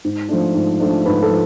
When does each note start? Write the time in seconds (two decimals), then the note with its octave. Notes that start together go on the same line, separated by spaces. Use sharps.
0.04 G#2
0.29 F3 A3 D4
0.55 G#2
0.80 F3 A3 D4
1.06 G#2 B4
1.22 A4
1.30 F3